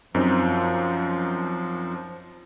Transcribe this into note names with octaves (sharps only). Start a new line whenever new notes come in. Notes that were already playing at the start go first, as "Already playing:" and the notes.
F#2 F3 C4 D#4